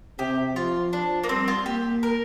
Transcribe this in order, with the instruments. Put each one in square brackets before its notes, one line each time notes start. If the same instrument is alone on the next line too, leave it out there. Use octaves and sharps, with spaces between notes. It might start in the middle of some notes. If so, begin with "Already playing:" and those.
[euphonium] C3 [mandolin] G4
[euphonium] F3 [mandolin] F4
[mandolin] D4
A#3
[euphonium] G3 [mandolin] C4
[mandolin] F4
[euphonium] A#3 [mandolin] G4
[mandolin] A#4